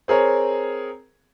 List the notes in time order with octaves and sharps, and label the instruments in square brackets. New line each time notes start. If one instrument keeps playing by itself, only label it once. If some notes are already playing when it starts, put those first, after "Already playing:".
[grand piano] C4 G#4 A#4 C#5